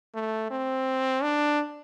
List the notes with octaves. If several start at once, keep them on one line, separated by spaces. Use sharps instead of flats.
A3
C4
D4